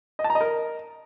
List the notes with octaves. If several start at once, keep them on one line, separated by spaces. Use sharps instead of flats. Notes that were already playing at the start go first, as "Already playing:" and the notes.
D#5
A5
A#5
D#5
A#4